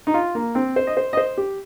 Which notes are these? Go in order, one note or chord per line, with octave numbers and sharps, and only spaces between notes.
D#4
F4
A#3
C4
C5
D#5
C5
D#5
C5
G4